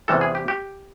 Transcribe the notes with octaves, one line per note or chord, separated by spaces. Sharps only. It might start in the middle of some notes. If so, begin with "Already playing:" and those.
E2 C3 E3 G3 A4
G#4
G4
G4